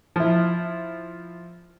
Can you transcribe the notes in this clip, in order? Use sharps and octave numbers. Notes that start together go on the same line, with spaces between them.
F3 E4